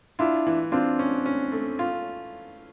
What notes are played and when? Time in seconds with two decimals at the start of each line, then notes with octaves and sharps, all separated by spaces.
0.19 D4 E4 F4
0.47 E3
0.72 C4 D4 F4
0.99 C#4
1.26 C#4
1.52 A3
1.79 F4